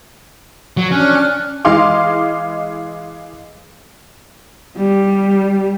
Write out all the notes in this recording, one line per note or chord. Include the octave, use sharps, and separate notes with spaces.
F#3
C#4 D4 F6 F#6
E3 G#3 D#5 F5 C6 D6
G3